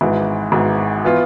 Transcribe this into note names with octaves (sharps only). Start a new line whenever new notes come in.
G#1 G#2 E3
G#1 G#2 E3
E3 B3 F4